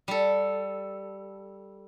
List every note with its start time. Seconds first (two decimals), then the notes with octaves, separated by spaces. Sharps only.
0.08 G3 A4